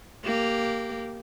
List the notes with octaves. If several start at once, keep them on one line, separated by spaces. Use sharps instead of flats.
A#3 G4